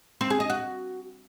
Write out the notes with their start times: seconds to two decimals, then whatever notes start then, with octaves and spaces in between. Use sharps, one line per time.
0.21 C4
0.30 G#4
0.40 D#5
0.50 F#4